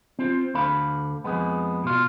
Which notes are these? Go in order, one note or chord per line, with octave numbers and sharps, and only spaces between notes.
C4 F4
D2 D3 F5 B5
F2 G#3 B3
B2 F4